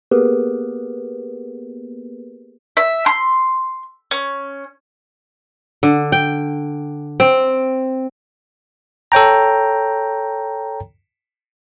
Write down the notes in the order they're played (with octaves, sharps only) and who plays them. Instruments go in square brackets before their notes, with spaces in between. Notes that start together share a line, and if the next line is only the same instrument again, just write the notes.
[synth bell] A#3 B3 G4 G#4 A#4 B4
[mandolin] E5
C6
C#4
[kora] D3
G5
C4
[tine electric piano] A4 C#5 G5 A#5